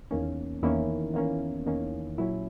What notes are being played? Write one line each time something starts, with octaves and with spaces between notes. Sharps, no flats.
E2 D#3 A#3 C#4
E2 D#3 A#3 C#4 E4
E2 D#3 A#3 C#4
E2 D#3 A#3 C#4
A#2 F#3 C#4 E4